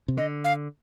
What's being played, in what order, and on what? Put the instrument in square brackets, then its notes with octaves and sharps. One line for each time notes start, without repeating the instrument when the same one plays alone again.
[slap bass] C3
[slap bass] D3 [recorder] D#5
[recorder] F5